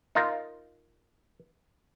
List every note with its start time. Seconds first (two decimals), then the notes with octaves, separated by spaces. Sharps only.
0.15 D#4 F4 A#4